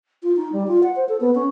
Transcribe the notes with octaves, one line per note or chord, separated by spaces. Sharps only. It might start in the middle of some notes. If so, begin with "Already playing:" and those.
F4
D#4
G3
F4
F#5
C5
A4
B3
C#4